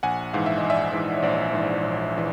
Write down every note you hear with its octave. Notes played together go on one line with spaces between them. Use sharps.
A#1 F#5 G#5
G#2 E3 F5
E5
D#5
A#1
D5 E5
G#2 E3
C#5
A#1 C5 D5
G#2 E3
A#1
E3